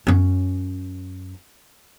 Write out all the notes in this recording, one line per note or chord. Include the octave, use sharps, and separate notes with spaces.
F#2 C#4